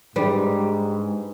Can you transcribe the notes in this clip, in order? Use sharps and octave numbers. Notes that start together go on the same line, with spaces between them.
G#2 G3 D4 G#4 B4